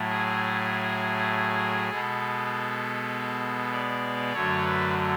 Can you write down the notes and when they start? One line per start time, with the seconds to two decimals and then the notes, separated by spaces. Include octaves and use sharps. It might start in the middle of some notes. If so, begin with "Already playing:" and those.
Already playing: A2 F#3 A3
0.08 G#4
1.90 B2 G#3 B3 A4
3.72 D5
4.32 F#2 D3 F#3 A3 C#5
4.63 B4